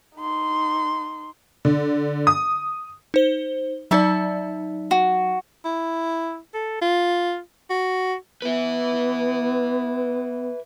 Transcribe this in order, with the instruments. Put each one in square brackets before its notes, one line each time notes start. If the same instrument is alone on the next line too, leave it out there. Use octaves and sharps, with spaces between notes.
[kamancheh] D#4 C6
[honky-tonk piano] D3
D#6
[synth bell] D#4 C5 G7
[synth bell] F#3 D#4 D5 [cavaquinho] E5 A5
[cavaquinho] F#4
[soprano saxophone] E4
A4
F4
F#4
[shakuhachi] B3 [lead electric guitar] B4 E5